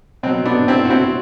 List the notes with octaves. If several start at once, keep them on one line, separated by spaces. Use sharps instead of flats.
B2 F#3 C4
B3 D4
C4 E4
F#4
C4 E4